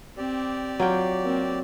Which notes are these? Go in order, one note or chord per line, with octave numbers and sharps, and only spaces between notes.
C4 G4 D5
F#3 F4 G5
A#3 C4